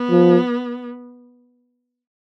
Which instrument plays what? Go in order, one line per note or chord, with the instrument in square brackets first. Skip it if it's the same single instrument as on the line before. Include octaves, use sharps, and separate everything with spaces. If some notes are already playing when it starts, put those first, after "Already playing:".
Already playing: [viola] B3
[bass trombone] F3